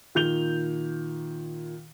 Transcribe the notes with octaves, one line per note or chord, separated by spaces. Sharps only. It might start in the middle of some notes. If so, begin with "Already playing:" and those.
A#2 D#3 G6 F7 G7